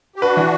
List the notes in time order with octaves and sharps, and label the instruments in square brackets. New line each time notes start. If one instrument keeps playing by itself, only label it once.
[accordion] G4
[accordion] D4 F#4 [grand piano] B4
[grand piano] E3